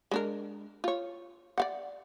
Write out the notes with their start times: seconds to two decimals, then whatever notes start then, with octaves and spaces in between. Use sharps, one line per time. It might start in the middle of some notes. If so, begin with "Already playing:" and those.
0.11 G#3 D4 A#4
0.84 F4 C#5
1.58 D5 F5 F#5